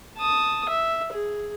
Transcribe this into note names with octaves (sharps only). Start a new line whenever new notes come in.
A5 D#6
E5
G#4